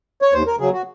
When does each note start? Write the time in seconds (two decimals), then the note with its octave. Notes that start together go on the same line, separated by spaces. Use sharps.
0.22 C#5
0.33 D#2 C5
0.47 A#4
0.59 C#3 F#3 G#4
0.73 F#4